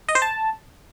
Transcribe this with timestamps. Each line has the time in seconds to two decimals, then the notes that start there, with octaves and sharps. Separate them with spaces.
0.09 D#5
0.15 C5
0.22 A5